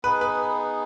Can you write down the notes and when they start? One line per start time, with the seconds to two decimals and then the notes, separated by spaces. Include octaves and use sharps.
0.04 B3 D#4 G#4 B4
0.21 B4